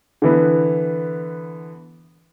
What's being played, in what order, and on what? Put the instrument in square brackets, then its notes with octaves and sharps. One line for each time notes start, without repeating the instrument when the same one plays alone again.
[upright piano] D3 E3 B3